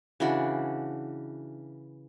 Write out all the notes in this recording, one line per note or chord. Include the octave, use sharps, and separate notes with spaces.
C#3 E3 D4 F#4